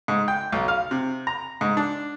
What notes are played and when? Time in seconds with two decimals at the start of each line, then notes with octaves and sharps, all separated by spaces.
0.08 G#2
0.28 G5
0.52 B1
0.68 F5
0.91 C3
1.27 A#5
1.61 G#2
1.77 D4